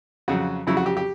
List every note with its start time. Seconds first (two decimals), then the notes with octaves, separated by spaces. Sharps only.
0.28 F2 C#3 F#3 F#4
0.67 F2 C#3 F#3 E4
0.77 F#4
0.86 G4
0.97 G4